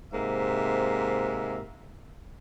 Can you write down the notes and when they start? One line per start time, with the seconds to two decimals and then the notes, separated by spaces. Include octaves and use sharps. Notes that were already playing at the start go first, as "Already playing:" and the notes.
0.12 G#2 C3 A#3 E5